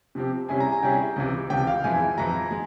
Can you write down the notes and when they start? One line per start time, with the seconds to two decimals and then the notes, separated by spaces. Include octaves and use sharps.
0.15 C3 F3 C4 G4
0.48 C3 G3 C#4 E4 G#4 G#5
0.60 A#5
0.72 G#5
0.83 C3 G3 C#4 E4 G#4 G5
1.16 C#2 C3 E3
1.50 C#2 C3 E3 G5
1.67 F5
1.84 F2 E3 G#3 E4 G#5
2.18 F2 E3 G#3 E4 A#5
2.51 G#3